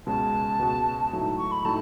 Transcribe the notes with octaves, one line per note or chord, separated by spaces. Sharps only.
C#2 B2 G#3 C#4 F#4 A5
C#2 B2 G#3 C#4 F#4
A2 F#3 A3 D#4
C#6
B5
A2 F#3 A3 D#4 A5